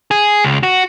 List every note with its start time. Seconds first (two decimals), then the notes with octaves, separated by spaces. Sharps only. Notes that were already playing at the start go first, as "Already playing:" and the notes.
0.11 G#4
0.44 C#2
0.63 F#4